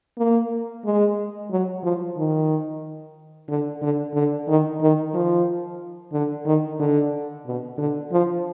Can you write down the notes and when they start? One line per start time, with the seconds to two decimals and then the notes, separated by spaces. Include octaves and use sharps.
0.18 A#3
0.85 G#3
1.51 F#3
1.83 F3
2.17 D#3
3.49 D3
3.82 D3
4.15 D3
4.48 D#3
4.81 D#3
5.14 F3
6.13 D3
6.46 D#3
6.80 D3
7.46 B2
7.78 D3
8.12 F3